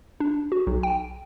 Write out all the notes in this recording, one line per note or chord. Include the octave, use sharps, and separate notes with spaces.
D4
F#4
B1
G5